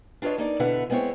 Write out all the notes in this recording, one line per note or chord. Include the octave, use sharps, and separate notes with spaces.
D4 F4 B4 C#5 D#5
A#3 D#4 D5
B2 D3 E4 B4 E5 F#5
G#3 B3 C4 D4 E4 C#5